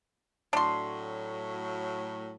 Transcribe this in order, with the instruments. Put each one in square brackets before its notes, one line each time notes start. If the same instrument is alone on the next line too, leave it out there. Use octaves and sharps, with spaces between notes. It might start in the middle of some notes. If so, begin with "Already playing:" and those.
[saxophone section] A2 F#3 [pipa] D4 C6